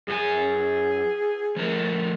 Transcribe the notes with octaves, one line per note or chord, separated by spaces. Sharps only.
F#2 F#4 G#4 G#5
F3 A3 A#4